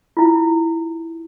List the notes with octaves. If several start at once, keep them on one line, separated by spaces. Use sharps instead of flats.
E4 F4